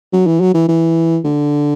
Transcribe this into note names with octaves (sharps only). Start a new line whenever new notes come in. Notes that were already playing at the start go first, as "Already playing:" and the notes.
F#3
E3
F#3
E3
E3
D3